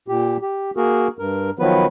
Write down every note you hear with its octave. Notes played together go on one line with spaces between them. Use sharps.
A#2 G4
G4
A#3 F#4 G#4 A#4
G2 A#4
D#3 F3 F#3 B3 B4